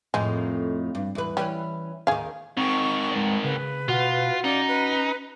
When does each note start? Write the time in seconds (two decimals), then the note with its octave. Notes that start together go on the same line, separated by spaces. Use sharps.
0.14 F2 A2 D#3 G#3
0.95 G2
1.15 E2 B4
1.37 E3 G3 C#4 B4
2.07 D#2 D#3 G#4 F5
2.57 G#2 D#3 C4 C#6
3.12 G#3 B4 D5
3.44 C#3 B4
3.88 B2 F4 F#4 F#5
4.44 C#4 D#4 D5
4.68 B4